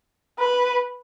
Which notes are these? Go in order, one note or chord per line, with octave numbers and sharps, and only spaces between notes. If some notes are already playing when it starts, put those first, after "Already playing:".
B4